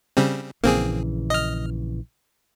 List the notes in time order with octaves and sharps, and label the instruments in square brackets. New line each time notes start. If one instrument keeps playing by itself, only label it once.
[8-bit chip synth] C#3 G3 C4
[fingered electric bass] A#1 C#3 E3 [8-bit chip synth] A#3 C4 G#4
[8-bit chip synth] D#5 F6